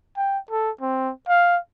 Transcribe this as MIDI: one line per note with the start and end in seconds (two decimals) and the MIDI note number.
0.17 0.38 79
0.51 0.71 69
0.81 1.11 60
1.28 1.59 77